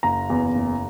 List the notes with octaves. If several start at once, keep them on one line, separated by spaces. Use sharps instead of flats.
F#1 A#5
E2
F#1